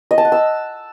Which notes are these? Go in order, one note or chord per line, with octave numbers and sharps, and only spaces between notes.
D#5
A5
F#5
E6